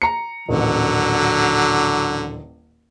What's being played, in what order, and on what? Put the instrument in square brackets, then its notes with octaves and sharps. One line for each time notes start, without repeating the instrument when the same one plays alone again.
[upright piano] A#5 C#7
[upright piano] D#1 A1 [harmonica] D3 F#3